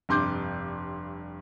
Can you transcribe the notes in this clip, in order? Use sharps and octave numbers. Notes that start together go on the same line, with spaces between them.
F1 G2 C6 D6 G6